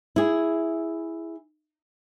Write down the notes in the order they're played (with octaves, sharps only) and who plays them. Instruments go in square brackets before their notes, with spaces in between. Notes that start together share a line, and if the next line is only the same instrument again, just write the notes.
[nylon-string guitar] E4 G#4